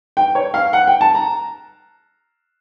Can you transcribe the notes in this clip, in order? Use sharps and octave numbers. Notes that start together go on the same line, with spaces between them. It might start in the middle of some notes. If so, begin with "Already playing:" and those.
G5
C#5
F5
F#5
G5
A5
A#5